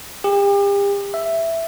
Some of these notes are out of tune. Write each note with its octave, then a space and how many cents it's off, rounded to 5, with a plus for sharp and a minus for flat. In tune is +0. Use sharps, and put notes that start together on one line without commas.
G4 +40
E5 +5